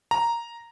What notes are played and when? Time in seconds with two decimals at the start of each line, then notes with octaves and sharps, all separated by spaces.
0.11 A#5